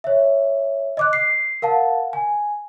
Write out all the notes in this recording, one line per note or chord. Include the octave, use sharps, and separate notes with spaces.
C#5 E5
D#5 D6 F#6
C7
A#4 F5 F#5 A5
G#5